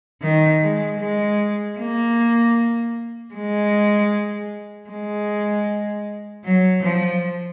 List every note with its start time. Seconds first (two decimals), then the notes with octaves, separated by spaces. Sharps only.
0.22 D#3
0.62 G#3
1.00 G#3
1.78 A#3
3.34 G#3
4.90 G#3
6.45 F#3
6.83 F3